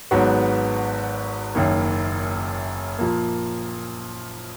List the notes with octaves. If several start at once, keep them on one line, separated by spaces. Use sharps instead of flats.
G#1 G#2 F#3 B3 F#4
F#1 F#2 D#3 A#3
A#2 F3 A#3